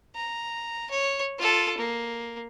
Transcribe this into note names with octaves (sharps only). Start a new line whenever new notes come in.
A#5
C#5
F4 A4
A#3